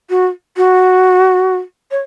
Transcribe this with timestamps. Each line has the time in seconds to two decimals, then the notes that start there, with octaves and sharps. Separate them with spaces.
0.10 F#4
0.57 F#4
1.91 C#5